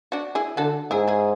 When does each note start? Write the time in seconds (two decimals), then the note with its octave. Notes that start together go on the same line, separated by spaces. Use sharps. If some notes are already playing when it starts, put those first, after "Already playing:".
0.12 D4 F#4
0.35 E4 G#4
0.57 D3 F#4 A4
0.91 G#2 E4 G#4
1.08 E4 G#4